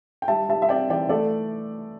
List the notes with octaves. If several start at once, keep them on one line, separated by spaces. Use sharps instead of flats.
G5
G3 E5 A5
G3 E5 A5
E5
C4 D5 G5
E3 D5 G5
A3 A4 D5